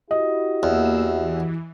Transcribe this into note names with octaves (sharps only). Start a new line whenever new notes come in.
E4 F#4 G4 D#5
E2 A#3 E6
E3